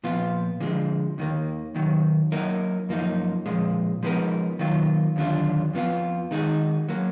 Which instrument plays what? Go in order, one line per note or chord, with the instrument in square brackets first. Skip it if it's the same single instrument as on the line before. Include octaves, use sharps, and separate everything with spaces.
[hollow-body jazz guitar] A#2 F3 B3 F4
D3 F3 G#3
D#2 D#3 A#3
D#2 D#3 F#3
F#3 A#3 D#4 A#4
F#2 F3 A#3 D#4
A#2 F3 G#3
F3 G#3 B3 D#4 A#4
D#3 F#3 A#3 F4
D#2 D3 F#3 D4 F4
F2 F3 B3 F4
D#3 G#3 D#4 F#4
F#3 A#3